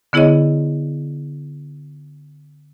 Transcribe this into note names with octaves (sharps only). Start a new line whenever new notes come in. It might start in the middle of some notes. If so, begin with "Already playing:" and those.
D3 B3 E4 G#4 C#5 D#5